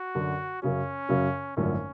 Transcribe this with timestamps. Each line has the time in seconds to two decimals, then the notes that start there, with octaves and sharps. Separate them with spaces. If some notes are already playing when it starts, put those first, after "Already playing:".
Already playing: F#4
0.15 F#2 D3 F#3
0.62 F#2 C#3 F#3 C#4
1.09 F#2 C#3 F#3
1.57 G#1 F#2 D3 F3 A3 C#4